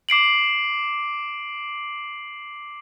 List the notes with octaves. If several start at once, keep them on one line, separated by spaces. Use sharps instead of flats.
D6 C7 D7 F#7